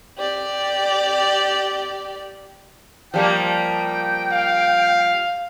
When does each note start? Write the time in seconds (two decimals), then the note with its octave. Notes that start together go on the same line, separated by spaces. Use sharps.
0.18 G4 D5
3.14 F3 G3 A#3 G5
4.32 F5